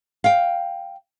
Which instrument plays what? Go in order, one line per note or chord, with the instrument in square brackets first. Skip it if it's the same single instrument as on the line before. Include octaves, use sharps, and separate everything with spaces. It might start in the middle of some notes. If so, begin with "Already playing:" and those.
[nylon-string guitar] F5 G5